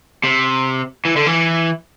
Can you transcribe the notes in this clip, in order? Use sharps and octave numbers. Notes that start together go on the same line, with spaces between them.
C3
E3
D3
E3